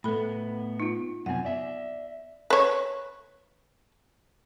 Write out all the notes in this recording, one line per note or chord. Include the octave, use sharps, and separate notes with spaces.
A2 B3 A4 B5
D#4 F4
F#2 C3 B3 F#5 G#5
D5 E5
B4 C#5